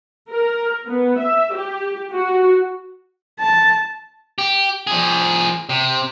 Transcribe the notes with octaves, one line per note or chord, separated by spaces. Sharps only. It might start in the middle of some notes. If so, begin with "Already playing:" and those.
A#4
B3
E5
G4
F#4
A5
G4
F3 G#4
C3